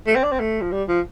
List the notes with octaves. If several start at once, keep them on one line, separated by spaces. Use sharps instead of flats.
A3
C4
D4
C4
A3
F3
G3
F3